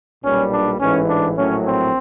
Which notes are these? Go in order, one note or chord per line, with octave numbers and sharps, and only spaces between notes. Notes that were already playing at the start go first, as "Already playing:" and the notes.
B1 A#2 G3 C#4
D4
A1 G#2 E3 C#4
D4
A#1 A2 F#3 C#4
C4